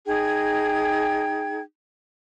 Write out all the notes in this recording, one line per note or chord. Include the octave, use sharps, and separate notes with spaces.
D#4 G#4 G5 G#6